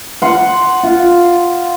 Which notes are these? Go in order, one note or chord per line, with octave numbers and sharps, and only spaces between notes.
F#5 C6
F4